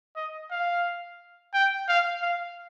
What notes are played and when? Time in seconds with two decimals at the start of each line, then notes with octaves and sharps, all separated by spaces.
0.16 D#5
0.51 F5
1.54 G5
1.88 F5
2.22 F5